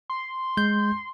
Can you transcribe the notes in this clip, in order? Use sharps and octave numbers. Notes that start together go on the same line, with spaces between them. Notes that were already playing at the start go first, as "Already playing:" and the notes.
C6
G#3 G6